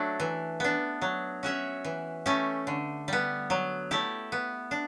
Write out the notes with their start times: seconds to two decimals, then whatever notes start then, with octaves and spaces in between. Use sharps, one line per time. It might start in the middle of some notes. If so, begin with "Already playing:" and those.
Already playing: F#3 A3 D4
0.20 E3
0.60 B3 D4
1.02 F#3
1.43 C#4 F#4 C#5 E5
1.85 E3
2.26 A3 C#4 G4
2.67 D3
3.08 G3 B3
3.50 F#3
3.91 A3 E4 G4
4.32 B3
4.71 D4